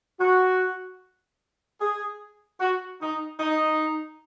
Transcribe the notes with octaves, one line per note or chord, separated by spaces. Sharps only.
F#4
G#4
F#4
D#4
D#4